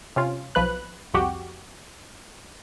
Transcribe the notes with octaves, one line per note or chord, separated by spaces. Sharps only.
C3 C#4 F4
B1 F3 B4 F#6
C2 F2 F#4 G4